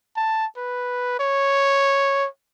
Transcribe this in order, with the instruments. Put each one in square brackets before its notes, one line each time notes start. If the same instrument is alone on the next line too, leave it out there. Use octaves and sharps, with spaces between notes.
[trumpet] A5
B4
C#5